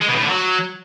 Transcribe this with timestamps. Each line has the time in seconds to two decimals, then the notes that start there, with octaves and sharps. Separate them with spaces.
0.01 G#3
0.08 B2
0.15 A2
0.22 D3
0.30 F#3